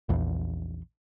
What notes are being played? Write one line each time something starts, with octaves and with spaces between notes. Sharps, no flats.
A#1 E2